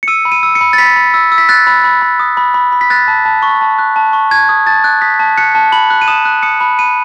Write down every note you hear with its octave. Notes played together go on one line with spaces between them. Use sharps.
C#7
E6 D#7
B5
D#7
E6
C#7
B5
A6
B5 B6
B5
E6
E6
B6
F#6 A6
B5
B5
B5
D#6
B5
B5
B5
B6
F#6 A6
A5
A5
C#6
A5
F#6
A5
C#6
A5 G#6
D#6
A5 A6
F#6
D#6 B6
A5
F#6 C#7
A5
B5 F#7
F#6
D#7
D#6 E7
F#6
D#6 C#7
B5
B5 D#7